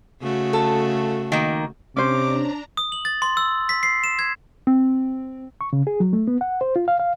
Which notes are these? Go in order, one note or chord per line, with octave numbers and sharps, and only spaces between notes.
C#3 A3 F#4
A4
D#3 A#3
C3 C#4 D4 C5 A#5 D6
D#6
F#7
A6
C6
E6
B6
C7
E7
G#6
C4
C#6
C#3
G#4
F#3
A3
B3
F#5
C5
F4
F5
F5